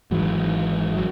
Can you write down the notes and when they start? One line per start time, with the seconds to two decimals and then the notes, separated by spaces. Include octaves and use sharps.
0.11 G#1 G#2 E3 F#3
0.95 F#3